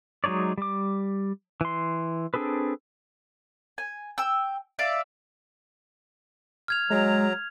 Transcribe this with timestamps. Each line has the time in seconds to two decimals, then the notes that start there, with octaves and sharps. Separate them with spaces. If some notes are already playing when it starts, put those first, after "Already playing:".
0.24 F#3 G#3 D#4 C#5 D5
0.58 G3 D6
1.61 E3 C6
2.34 C4 D4 G#4 A4 B4
3.78 G#5
4.18 G5 E6
4.79 D5 E5 F5
6.68 F6 G#6 F7
6.90 F#3 G#3 A#5